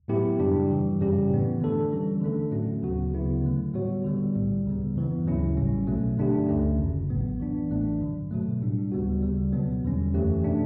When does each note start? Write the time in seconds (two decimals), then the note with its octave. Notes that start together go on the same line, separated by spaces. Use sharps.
0.08 A2 F#3 B3 E4 G4
0.39 F#2 C#3 G3 D4 G4
0.69 G2 E3 G3
1.00 F#2 C#3 G3 C#4 G4
1.30 A2 E3 B3
1.61 D3 A3 D4 A4
1.91 E3 G3 C#4
2.21 D3 A3 D4 A4
2.52 A2 F#3 A3 C#4 F#4
2.82 D2 C#3 F#3 B3 F#4
3.13 D2 C#3 F#3 B3 E4
3.44 D3 F#3 A3
3.74 A2 G3 B3 F#4 C#5
4.04 D3 G3 B3
4.35 B1 A2 G3
4.66 C#2 C#3 G3 B3
4.96 G2 E3 B3
5.26 D2 C#3 F#3 C#4 E4
5.57 A1 A2 G3 C#4
5.87 B1 B2 F#3 A3
6.18 G2 D3 A3 D4 G4
6.48 D2 D3 A3 C#4
6.78 G1 F#2 C#3
7.09 A1 A2 F#3 B3
7.40 E3 B3 D4
7.70 A1 A2 E3 A3 D4
8.01 G2 D3 F#3
8.31 B2 F#3 A3
8.62 A2 G3 D4
8.92 D2 C#3 G3 B3 F#4
9.23 D2 C#3 G3
9.53 C#2 B2 F#3 B3
9.83 E2 D3 G3 C#4
10.14 F#2 E3 A3 C#4 G4
10.44 B2 A3 D4